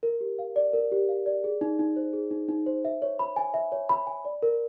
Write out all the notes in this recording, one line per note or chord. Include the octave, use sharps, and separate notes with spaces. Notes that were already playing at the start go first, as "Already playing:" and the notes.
A#4
G4
F5
D5
A#4
G4
F5
D5
G#4
D#4
D#4
C5
G#4
D#4
D#4
C5
E5
C#5
B5
G#5
E5
C#5
B5
G#5
D5
A#4